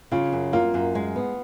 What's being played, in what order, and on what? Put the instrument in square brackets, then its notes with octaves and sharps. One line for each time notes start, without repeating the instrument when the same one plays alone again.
[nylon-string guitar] C#3 [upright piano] F4
[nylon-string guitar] F#2
[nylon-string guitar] A#3 [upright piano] F4
[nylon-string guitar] F#2
G#3
B3